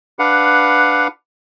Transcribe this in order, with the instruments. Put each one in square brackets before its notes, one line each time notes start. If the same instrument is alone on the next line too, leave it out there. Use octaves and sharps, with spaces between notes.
[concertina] D4 B4 F5 F#5